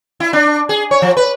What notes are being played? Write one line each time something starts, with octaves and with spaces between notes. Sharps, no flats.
E4
D4
G#4
C#5
F3
B4